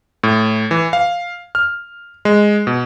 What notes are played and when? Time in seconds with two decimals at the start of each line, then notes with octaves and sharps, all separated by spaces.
0.23 A2
0.71 E3
0.93 F5
1.55 F6
2.25 G#3
2.67 B2